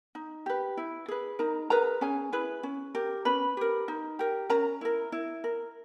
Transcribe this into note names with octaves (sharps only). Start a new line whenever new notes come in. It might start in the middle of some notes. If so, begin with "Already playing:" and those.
D#4
G4 B4
E4
G#4 B4
D#4 A#4 A#5
G#4 A#4 B4 A#5
C#4 G#4 G#5
E4 G#4 B4
C#4
G4 A#4
C#4 B4 B5
G4 A#4
D#4
G4 A#4
C#4 A#4 A#5
E4 A#4
E4
A#4